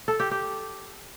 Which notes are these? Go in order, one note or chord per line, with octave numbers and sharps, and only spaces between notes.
A4
G4
G4